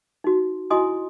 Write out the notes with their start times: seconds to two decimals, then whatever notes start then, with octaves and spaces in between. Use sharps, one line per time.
0.24 D#4 F#4
0.70 E4 F#4 D#5 G#5 C6 D#6